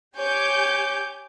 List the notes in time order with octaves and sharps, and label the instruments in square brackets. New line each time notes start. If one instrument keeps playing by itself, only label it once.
[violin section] G4 G#5 G6 [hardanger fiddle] C#5 D6